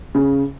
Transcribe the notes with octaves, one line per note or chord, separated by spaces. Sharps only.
C#3